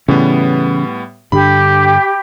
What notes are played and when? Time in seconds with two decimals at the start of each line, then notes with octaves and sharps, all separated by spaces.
0.08 A2 C#3 E3 G3 B3 C#4
1.32 G2 D3 D4 G4 B5